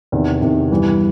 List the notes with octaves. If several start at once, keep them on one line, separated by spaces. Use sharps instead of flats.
E2 C3 D#3
E2 C3 D#3
G2 E3 G3 B3